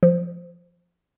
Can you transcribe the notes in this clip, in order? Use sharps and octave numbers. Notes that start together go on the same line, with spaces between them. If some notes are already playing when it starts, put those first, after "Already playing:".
F3